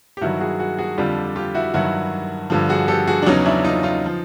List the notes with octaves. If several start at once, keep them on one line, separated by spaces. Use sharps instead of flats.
G4
G2 D#3 F#3 E4 F#4
F#4 G#4
F#4 G#4
F#4 G#4
F2 D3 G3 F4 G4
F4 G4
E4 F#4
G2 D#3 F#3 E4 F#4
G2 D3 F3
F#4 G#4
G4 A4
F#4 G#4
D4
E2 C#3 F#3 C#4 D#4
D4 E4
D#4 F4
D#4 F4
F3